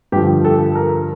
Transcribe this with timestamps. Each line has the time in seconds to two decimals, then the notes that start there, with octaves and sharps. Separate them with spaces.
0.12 G2 D3 F3 G4
0.45 A4
0.75 A#4